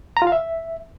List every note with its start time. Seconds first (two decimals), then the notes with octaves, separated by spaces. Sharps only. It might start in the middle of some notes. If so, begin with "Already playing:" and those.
0.17 A#5
0.22 F4
0.27 F5
0.32 E5